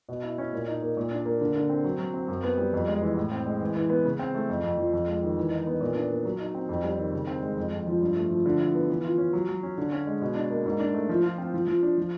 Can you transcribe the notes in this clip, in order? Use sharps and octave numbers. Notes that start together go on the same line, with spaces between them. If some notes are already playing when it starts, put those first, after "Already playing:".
B2
E4
C#4
A#2
D#4
A#3
A#2
D4
A#3
D3
D3
C4
F#3
F#3
C4
F#2
B3
G3
F2
G#3
E3
A2
C4
G#3
E3
E3
B3
C#3
C4
A3
F2
F2
F3
F2
G#3
D#3
E3
D#4
B3
A#2
D4
A#3
F#3
D#4
C4
F2
G3
D#3
C#3
C4
G#3
F2
F2
F3
G2
A3
F3
D3
E4
B3
E3
F4
C#4
F#3
F#3
C#4
D3
C#4
G#3
B2
D4
A#3
G#2
D4
A3
F3
F4
C4
F3
F3
D4
F3